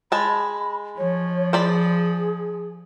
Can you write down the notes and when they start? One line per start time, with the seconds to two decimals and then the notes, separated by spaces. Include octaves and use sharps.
0.12 G#3 A5 B5
0.98 F3 C#5
1.53 G#4 C5 D5 B5